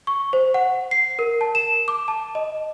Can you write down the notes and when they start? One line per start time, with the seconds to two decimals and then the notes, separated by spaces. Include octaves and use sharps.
0.07 C#6
0.33 C5
0.54 F#5
0.91 C7
1.19 A#4
1.41 A5
1.55 E7
1.88 D6
2.08 A5
2.35 D#5